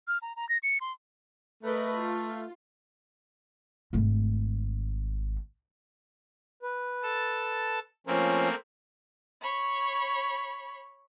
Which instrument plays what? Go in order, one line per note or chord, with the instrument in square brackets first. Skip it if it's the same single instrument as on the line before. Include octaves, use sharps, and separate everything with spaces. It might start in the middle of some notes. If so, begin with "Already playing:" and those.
[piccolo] F6
A#5
A#5
A#6
C#7
C6
[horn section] A3 [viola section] A#4 B4 D#5
[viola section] F4
[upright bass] G#1 A3
[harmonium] B4
[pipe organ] A4 A5
[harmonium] F3 C#4 [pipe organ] A3 A#3 C4
[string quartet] C#5 B5